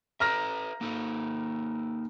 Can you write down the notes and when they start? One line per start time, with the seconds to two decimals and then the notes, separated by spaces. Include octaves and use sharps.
0.20 A4 B4 E5 A#5 F6 A#6
0.81 A#3 D#4 A4